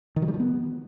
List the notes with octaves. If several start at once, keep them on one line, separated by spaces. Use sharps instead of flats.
D#3
F#3
G3
F3
B3